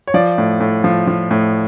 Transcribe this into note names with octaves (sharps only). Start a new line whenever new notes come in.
C#5
F3 D5
A2
A2
F3
F3
A2